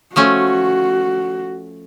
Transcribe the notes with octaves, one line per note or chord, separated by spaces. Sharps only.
F3 A3 C#4 F#4